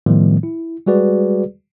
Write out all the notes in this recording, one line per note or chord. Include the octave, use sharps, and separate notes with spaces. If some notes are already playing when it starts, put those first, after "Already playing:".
A2 D#3 F3 G3 A3 B3
E4
G3 G#3 F#4 G#4 B4 D5